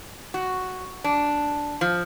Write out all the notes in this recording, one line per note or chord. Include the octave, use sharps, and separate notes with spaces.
F#4
D4
F3